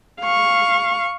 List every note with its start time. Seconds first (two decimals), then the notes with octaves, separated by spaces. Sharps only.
0.21 F5 C#6